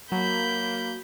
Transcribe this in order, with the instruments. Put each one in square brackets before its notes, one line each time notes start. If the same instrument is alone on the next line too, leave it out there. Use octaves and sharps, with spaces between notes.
[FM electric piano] F#3 [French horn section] A#3 [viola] B5 [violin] G6